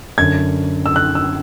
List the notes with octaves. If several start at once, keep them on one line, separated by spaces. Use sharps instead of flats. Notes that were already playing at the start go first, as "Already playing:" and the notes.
F#2 D3 G#6
E6
F#6
E6